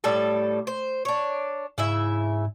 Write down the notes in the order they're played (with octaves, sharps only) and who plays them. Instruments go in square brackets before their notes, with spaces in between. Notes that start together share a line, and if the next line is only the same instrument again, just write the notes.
[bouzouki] A2 G3 A4
C5
D4 C#5
[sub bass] G#2 [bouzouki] C#3 E4 E5